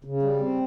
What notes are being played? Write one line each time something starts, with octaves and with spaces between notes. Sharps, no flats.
C#3
G3
C4